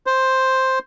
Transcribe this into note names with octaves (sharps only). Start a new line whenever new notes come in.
C5